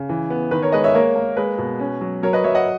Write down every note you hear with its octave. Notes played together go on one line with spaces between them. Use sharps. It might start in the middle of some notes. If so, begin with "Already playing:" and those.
Already playing: C#3
E3
B3
D#3 B4
A#4 C#5
G#3 B4 D#5
C#5 E5
A#3 A#4 C#5
A#3
G#3 B4
B2
C#4
F#3
F#3 A#4 C#5
B4 D#5
F#3 C#5 E5
D#5 F#5